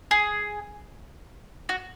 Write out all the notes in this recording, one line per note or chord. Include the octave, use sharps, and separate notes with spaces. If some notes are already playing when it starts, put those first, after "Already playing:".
G#4
F#4